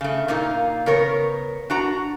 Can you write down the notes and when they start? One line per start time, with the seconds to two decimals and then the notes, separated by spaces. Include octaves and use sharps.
0.01 C#3 A3
0.28 A#2 A#3 D#4 F4
0.86 C#3 B3 A#4 C#5
1.70 D4 F#4 A#5